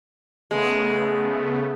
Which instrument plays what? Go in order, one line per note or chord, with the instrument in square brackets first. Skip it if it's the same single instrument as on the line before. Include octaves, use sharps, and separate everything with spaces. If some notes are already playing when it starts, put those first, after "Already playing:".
[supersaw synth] C#3 A3 B3 [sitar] G#3